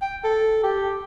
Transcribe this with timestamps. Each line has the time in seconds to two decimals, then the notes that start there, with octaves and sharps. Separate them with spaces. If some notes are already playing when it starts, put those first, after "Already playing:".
0.02 G5
0.24 A4
0.63 G4